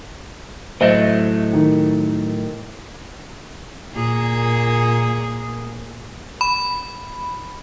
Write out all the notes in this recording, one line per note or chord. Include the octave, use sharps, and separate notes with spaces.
A2 F#3 A3 C5 D#5 E5
D#3
A#2 A#3 G#4
B5